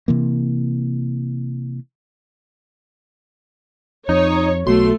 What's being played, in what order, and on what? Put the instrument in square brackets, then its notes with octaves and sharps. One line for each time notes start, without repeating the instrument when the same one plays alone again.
[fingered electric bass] C3 E3 A#3
[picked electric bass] F2 [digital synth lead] D#4 [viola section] C#5
[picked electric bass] B1 B2 [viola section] A3 [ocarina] F#4 [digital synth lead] C6